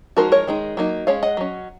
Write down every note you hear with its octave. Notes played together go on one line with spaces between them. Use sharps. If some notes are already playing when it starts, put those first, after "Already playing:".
F3 G#3 D#4 F#4 A#4
A#4 C#5
D#3 G#3 D#4
F#3 A#3 D#4
G#3 C#4 C#5 F5
D#5 F#5
F#3 C#4